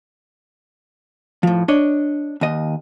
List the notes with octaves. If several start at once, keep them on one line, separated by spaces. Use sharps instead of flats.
A2 F3
D4 C#5 D#5
D#2 D#5